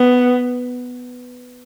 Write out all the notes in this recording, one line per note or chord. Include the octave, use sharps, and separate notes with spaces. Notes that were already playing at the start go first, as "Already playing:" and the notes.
Already playing: B3